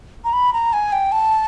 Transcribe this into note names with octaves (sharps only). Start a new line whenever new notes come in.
A#5
B5
A#5
G#5
G5
A5